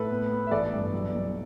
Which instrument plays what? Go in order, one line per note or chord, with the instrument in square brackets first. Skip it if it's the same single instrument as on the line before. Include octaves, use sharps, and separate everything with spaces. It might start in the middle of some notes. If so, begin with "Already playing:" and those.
Already playing: [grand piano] A2 [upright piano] A4 B4
[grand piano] B3
B3
[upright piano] E5
[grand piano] A1 [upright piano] A4 D5
[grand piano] G2
B1
B1